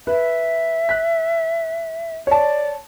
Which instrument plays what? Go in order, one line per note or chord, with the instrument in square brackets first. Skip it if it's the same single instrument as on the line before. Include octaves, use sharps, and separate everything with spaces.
[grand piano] B4 [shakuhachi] E5
[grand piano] F#6 B6
[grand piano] C#5 A5 [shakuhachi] D5